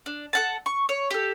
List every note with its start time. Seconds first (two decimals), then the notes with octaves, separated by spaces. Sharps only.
0.06 D4
0.33 A4 F#5 A5
0.66 C#6
0.89 C#5
1.11 G4 A4